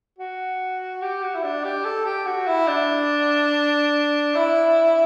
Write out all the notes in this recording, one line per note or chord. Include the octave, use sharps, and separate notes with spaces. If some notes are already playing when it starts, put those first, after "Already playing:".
F#4
G4
F#4
E4
D4
G4
A4
G4
F#4
E4
D4
E4